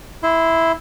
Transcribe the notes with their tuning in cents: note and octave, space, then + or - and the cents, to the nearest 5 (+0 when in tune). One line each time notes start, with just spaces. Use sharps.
E4 -5 C6 -25